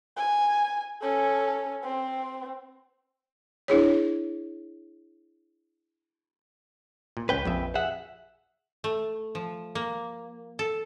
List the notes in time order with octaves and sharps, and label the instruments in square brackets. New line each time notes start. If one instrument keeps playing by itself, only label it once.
[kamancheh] G#5
C#4 A4
C4
[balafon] D4 E4 G#4 C#5
[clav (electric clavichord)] A#2
[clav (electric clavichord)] C#2 C#4 [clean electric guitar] B4 G5
[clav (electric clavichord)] A#1 F2 E5
[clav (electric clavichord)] G#4 [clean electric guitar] E5 F#5
[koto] A3
F3
A#3
A4